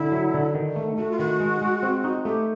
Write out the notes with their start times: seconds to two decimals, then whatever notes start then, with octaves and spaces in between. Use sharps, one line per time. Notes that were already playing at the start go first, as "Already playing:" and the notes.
Already playing: D3 E4
0.12 F#3
0.34 D3
0.54 D#3
0.76 A3
0.97 A3 F#4
1.12 F4
1.19 D#3 F#4
1.40 G#3
1.61 G#3
1.83 C4
2.04 D#4
2.25 A3 G4